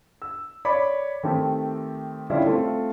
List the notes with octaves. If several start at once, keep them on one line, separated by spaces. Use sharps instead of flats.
E6
C#5 D5 B5 D6
D#3 A3 C4 G4 A4
D3 G3 C#4 E4 F4 D5
A3 C4 F4 A4